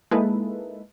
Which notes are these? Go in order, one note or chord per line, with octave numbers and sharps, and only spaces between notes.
G#3 A#3 D#4 E4 A4 B4